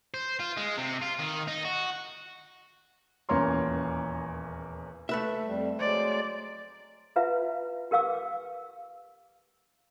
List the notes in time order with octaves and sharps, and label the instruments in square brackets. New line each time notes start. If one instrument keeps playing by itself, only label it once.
[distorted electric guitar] C5
F4
G#3
C3
F4
D#3
D#4
F#4
[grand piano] D#1 E2 A#3 C#4 A#4 C6
[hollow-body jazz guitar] A3 B4 E5
[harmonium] F2 G3
[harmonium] F#3 G#3 C5 [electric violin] D5
[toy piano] E4 F4 B4 E5 F5
G4 A#4 B4 F5 D6 E6